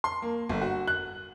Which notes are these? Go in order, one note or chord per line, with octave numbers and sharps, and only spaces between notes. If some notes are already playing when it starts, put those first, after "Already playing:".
C6
A#3
G1
F#4
F#6